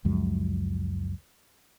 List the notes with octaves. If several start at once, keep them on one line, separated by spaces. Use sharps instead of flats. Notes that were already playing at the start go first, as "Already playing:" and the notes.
C#2 F#2 F3 G#3